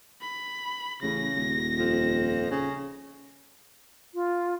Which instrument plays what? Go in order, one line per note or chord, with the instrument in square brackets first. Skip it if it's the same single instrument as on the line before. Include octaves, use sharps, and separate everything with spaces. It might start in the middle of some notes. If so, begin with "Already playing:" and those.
[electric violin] B5
[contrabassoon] A1 [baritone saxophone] C#3 [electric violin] A#6
[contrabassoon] D#1
[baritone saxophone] F2
C#3
[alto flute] F4